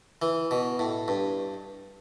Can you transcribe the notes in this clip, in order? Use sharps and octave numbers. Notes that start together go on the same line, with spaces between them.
E3
B2
A2
G2